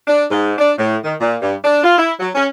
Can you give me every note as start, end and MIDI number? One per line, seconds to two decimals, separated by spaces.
0.07 0.24 62
0.31 0.53 44
0.58 0.72 62
0.78 0.96 45
1.04 1.15 51
1.21 1.36 46
1.42 1.55 43
1.63 1.83 62
1.84 1.97 65
1.98 2.13 64
2.19 2.29 54
2.35 2.46 61